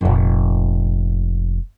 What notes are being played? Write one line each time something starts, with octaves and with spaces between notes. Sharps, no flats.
F1 A#2